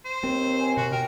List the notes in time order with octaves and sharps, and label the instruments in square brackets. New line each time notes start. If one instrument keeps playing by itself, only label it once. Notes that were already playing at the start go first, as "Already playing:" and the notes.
[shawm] C5
[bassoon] D#2 [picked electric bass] C4
[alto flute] G#5
[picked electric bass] B2 [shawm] F#4
[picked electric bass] B2 [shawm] A#4 [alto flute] G5